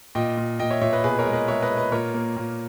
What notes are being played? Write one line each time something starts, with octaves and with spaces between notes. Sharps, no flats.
A#2 D#5 G5
A#2
A#2 D#5 G5
C#5 E5
A#2 C#5 E5
B4 D#5
B2 G#4 B4
A#4 C#5
G#3
B4 D#5
G#3 C#5 E5
B4 D#5
G#3
B4 D#5
A#2 A#4 C#5
A#3
A#2